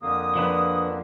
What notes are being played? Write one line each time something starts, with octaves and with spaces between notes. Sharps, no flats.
F2 D3 A#3 D#6
F3 D4 B4